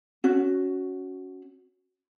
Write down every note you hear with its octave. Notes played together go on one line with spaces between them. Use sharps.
C#4 F#4